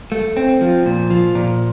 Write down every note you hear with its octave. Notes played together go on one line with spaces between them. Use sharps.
A3
C4
F3
A#2
F3
A#2